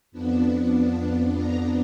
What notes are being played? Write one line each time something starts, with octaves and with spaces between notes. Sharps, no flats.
F2 F3 B3 D4
A#5